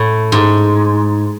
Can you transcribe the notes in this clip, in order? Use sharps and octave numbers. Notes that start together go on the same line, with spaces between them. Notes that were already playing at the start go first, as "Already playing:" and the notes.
Already playing: A2
G#2